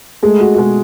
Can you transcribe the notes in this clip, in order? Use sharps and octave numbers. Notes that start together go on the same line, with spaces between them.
G#3 A3 G#4
F#4
F#4
B2 G#3 G#4